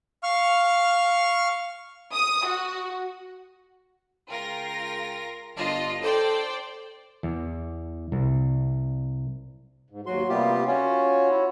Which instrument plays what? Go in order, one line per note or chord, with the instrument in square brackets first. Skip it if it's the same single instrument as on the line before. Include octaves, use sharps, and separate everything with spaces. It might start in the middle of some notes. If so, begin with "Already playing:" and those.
[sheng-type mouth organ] F5 C#6 F6
[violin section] D#6
F#4
[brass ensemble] C#2 G#4 G5 [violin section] F4 A#4 A#6
[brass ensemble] G1 [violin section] D4 F4 D#5
[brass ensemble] A4 [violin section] C5 D5 G5
[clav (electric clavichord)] E2
C2
[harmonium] G#2
[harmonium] D#2 F#4 [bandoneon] F#3 C6
[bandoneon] C3 F4 G4 [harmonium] G3 A#3 B3
[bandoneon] C#4 F4 [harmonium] F#4 C#5
[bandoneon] E4